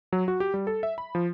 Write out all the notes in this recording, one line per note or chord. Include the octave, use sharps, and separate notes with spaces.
F#3
F#4
G4
G3
A4
E5
B5
F3